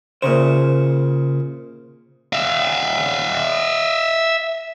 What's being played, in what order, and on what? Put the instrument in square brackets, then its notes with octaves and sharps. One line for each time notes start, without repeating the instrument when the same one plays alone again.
[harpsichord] A#2 C#6 [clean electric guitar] C#3 C5
[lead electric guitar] E5 F5